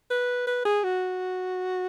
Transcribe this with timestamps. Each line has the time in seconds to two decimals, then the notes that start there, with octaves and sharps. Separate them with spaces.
0.10 B4
0.47 B4
0.65 G#4
0.84 F#4